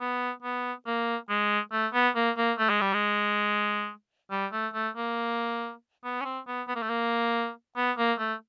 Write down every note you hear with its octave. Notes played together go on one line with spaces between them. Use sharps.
B3
B3
A#3
G#3
A3
B3
A#3
A#3
A3
G#3
G3
G#3
G3
A3
A3
A#3
B3
C#4
C4
B3
B3
A#3
A3
A#3
B3
A#3
A3